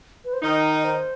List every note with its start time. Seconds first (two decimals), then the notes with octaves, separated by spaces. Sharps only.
0.25 B4
0.33 C5
0.42 D#3 D#4 D#5
0.85 C5